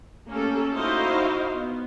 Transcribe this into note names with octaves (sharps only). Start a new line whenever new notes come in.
A3 A#3 C#4 G4 A4
D#4 E4 F#4 C5 D#5 F5
B3